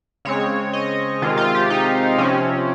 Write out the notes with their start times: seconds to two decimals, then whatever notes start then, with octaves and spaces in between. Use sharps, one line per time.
0.25 C#3 G#3 C4 C#5
0.73 D#5
1.22 C3 D#3 G#3 C4 F4
1.38 F4
1.55 G4
1.70 D#4
2.18 C3 F3 C4 C#4